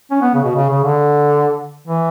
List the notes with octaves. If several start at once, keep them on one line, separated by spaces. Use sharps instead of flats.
C#4
B3
C#3
B2
C#3
C#3
D3
E3